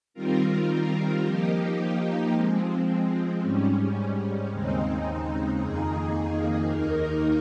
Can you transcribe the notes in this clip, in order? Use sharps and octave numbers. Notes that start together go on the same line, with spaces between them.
D#3 G3 C4 F4 A#4
F3 A#3 D#4 G4
F3 G#3 C4
G#2 G3 C#4
D#2 C#3 G#3 C4 D#4
F2 D#3 A#3 D#4 G#4
D#2 D#3 A#3 D#4 A#4